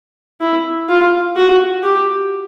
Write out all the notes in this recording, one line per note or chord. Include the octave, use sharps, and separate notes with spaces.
E4
F4
F#4
G4